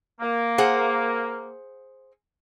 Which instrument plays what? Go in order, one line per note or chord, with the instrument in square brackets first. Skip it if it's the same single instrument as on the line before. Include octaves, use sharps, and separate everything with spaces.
[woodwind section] A#3
[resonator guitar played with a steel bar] G#4 C5 F#5